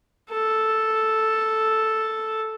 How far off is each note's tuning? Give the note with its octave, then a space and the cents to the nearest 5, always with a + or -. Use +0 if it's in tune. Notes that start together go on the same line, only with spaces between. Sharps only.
A4 +0